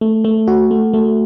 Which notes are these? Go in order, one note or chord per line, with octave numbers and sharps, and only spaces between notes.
A3
A3
F#4
A3
A3